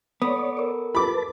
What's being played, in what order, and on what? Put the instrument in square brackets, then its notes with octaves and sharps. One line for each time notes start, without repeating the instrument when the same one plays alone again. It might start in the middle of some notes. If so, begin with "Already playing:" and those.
[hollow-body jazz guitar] B3 [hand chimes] A4 D#6 [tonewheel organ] C#5 D5
[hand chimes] A4 A#4
[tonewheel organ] B4 A5 [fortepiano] B5 D6